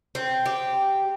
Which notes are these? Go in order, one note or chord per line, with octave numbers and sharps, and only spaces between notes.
C4
G4